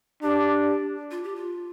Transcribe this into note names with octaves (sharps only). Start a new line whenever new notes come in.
D4 G4
F4
G4
F4